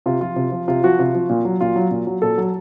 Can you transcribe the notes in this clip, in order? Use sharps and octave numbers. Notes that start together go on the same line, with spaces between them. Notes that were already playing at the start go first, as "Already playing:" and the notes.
C3 F4
F3 F4
C3
F3
C3 F4
F3 F#4
C3 F4
F3
A#2
F#3
A#2 F4
F#3
A#2
F#3
A#2 A4
F#3